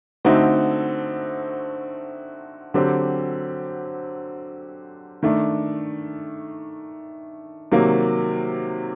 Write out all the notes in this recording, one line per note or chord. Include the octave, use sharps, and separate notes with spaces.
D3 A3 C4 D#4 F#4
D3 F#3 C4 G4
D#3 A3 D4
C3 D#3 F#3 A#3